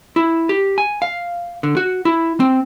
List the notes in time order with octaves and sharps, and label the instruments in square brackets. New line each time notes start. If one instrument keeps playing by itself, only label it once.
[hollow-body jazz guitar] E4
G4
G#5
F5
D3
F#4
E4
C4